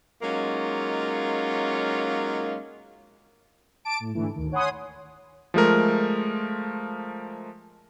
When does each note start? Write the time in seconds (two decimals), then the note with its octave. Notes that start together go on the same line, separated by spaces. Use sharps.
0.22 F#3 G#3 A#3 C#4 D#4 F4
3.85 A5 D6 D7
4.00 A2
4.14 G#2 D3 E3 A3
4.35 D2 D#3
4.52 C#5 F#5 G#5 B5 C6 D#6
5.54 F3 G#3 A3 A#4